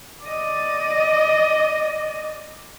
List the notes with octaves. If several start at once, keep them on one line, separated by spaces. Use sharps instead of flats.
D5 D#5